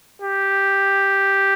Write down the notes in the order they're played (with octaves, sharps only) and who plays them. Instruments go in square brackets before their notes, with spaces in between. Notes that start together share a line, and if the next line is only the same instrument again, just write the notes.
[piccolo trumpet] G4